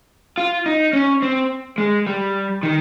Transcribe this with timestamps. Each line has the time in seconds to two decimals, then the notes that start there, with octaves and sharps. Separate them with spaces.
0.38 F4
0.66 D#4
0.93 C#4
1.22 C4
1.78 G#3
2.07 G3
2.63 D#3